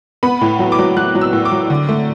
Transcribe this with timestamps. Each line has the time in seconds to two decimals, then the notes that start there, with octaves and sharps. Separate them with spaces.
0.23 B3 B5
0.41 A2
0.59 F#3
0.72 D6
0.79 F#3
0.96 F#3 F#6
1.15 F#3
1.21 E6
1.33 A2
1.45 D6
1.52 F#3
1.70 D3
1.89 A3